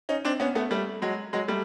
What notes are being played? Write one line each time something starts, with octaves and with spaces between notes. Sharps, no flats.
C#4 D#4
C4 D4
B3 C#4
A3 B3
G3 A3
F#3 G#3
F#3 G#3
G3 A3